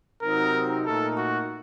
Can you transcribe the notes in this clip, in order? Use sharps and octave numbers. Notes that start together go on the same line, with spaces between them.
C3 F#3 C4 D#4 A#4
A#2 A3 D#4 A4 A#4
F#4